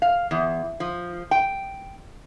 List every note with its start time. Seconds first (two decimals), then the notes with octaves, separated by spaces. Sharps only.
0.02 F5
0.31 E2
0.80 F3
1.31 G5